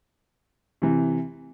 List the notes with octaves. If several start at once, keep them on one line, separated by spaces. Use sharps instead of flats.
C3 E3